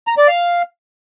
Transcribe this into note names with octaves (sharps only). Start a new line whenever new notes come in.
A#5
D5
F5